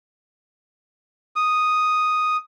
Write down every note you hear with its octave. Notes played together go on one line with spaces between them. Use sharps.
D#6